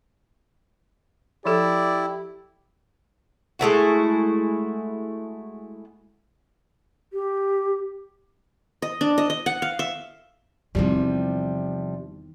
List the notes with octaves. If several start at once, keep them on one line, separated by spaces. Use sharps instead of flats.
F3 E4 G4 A4 D5
G#3 A3 E4 F#4
G4
D#5
D4
D#5
D#5
F#5
F5
E5
E2 C3 D#3 F3 G3